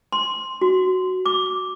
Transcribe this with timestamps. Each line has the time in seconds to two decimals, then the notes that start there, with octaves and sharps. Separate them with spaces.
0.12 C6
0.62 F#4
1.26 D6